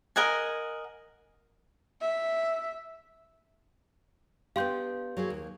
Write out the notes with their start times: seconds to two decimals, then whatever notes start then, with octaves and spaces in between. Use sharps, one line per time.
0.16 A#4 D#5 F#5 G#5
2.01 E5
4.56 B3 D4 G4 F5 C6 G6
5.17 F#3 A#3 G#4
5.30 D#2